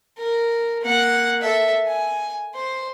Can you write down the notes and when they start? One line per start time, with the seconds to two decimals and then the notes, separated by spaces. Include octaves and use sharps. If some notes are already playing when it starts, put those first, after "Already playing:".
0.18 A#4
0.82 A#3 F#5
1.41 A4 E5
1.87 G#5
2.55 C5